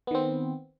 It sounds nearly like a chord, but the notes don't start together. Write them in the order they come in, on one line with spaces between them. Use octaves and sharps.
B3 D#3 C4